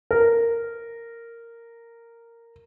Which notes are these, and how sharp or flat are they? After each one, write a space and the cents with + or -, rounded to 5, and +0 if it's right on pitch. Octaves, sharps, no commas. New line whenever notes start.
A#4 -10